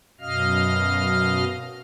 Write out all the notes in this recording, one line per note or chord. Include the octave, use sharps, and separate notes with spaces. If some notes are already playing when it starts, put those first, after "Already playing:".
F#2 B2 D#5 F5 F6